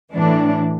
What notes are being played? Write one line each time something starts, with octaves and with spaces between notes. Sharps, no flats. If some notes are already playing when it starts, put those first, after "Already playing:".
A2 E3 D4